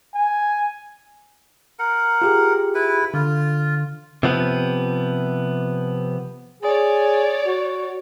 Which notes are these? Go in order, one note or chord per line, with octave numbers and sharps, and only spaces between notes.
G#5
A#4 F#5
F4 G4 G#4
E4 B4
D3 F4
C3 F3 B3
G#4 C#5 D5
F#4